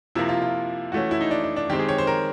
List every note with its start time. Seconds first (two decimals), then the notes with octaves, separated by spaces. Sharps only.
0.15 C3 F3 A#3 E4
0.29 F4
0.42 F4
0.92 E3 A3 C#4 F#4
1.11 E4
1.21 D#4
1.31 D4
1.44 D4
1.56 D4
1.70 D#3 G#3 C4 G4
1.79 G#4
1.89 C#5
1.98 C5
2.07 A#4